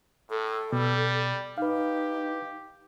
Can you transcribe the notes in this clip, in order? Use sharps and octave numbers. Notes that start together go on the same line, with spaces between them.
A2 A4
B2 G3
D#4 G4 B4 F5